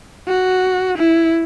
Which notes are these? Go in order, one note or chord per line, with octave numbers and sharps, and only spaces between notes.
F#4
E4